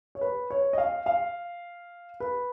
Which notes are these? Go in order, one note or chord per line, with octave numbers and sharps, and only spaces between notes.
C#5
B4
C#5
D#5
F5
F5
B4